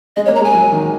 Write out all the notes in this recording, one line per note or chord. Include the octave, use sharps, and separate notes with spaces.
G#3 D#5
C#5
A#3
A#5
G#3 G#5
F#3
D#3